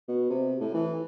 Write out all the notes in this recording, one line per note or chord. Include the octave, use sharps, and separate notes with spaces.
B2
C3
A2
E3